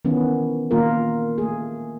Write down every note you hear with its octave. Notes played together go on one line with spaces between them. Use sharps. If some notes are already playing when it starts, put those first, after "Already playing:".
D#3 E3 B3 C#4
D#3 A#3 F4 A#4
A3 G#4